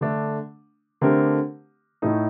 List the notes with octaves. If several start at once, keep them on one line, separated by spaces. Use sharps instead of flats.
D3 A3 D4
D3 A3 C4 G4 A#4
A2 A3 D#4